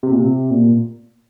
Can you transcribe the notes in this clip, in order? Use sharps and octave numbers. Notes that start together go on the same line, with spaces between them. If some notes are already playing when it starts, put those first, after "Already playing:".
C3
A#2
C3
A#2